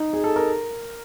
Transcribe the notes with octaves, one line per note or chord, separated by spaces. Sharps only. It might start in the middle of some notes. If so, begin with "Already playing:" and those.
Already playing: D#4
G#4
A4
A#4